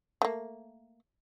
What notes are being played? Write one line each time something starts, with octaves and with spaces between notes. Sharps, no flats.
A3 A#3